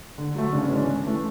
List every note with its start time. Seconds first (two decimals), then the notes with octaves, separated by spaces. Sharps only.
0.18 D3
0.35 F#3 A3
0.53 C#3 D4
0.64 C#4
0.69 E3 G#3 B3
0.75 D4
0.87 C#3
1.04 E3 A3